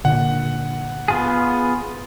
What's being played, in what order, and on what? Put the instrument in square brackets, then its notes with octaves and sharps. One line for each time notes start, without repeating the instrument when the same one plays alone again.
[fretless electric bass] A#2 D3 [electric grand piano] F#5
[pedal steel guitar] B3 F4 G#4